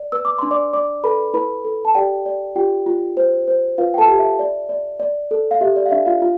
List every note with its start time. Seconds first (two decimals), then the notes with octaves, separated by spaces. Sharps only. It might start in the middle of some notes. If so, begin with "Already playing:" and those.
Already playing: D5
0.12 B4 E6
0.25 D6
0.38 D4 C6
0.51 D5 D6
0.73 D5 D6
1.04 A4 B4 B5
1.34 E4 B4 B5
1.64 A4
1.85 A5
1.95 G4 D5 G5
2.26 D5
2.56 F4 G4 G5
2.86 F4
3.17 C5
3.48 C5
3.78 F4 B4 F5
3.94 G5
3.98 A4 A5
4.08 G4
4.19 E5
4.39 D5
4.69 D5
5.00 D5
5.31 A4
5.51 F5
5.61 G4 E5
5.76 D5
5.86 F5
5.91 D4 E5
6.06 F4 F5
6.22 F4